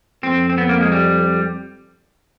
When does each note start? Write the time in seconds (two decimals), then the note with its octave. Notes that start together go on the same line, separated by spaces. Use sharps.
0.23 F2 C4
0.50 C4
0.58 B3
0.69 A#3
0.81 G#3
0.92 G3